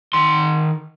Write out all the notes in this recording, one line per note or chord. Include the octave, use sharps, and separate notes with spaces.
D#3 C6